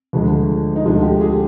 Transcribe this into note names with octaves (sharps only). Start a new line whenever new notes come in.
D2 D3 F3 G#3
D#4
D2 D3 F3 G#3 F4
G4
G#4